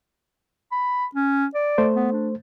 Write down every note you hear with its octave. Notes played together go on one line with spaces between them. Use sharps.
B5
C#4
D5
A3 C5
B3
D4